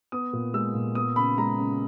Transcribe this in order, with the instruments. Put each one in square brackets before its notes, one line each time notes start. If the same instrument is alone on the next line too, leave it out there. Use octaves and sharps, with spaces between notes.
[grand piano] B3 D#6
A#2
G#3 E6
A#2
B3 D#6
C#3 B5
G#3 A#5
C#3